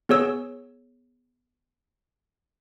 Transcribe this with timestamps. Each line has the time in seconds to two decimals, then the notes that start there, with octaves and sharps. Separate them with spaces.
0.09 B3 G#4 C#5 E6